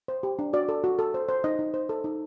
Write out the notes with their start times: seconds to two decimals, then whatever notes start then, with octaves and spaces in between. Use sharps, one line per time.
0.08 C5
0.23 G4
0.39 D4
0.53 F#4 D5
0.69 A4
0.84 F#4
0.99 A4
1.14 C5
1.29 C5
1.44 D#4 D#5
1.59 D#4
1.74 C5
1.89 A4
2.04 D#4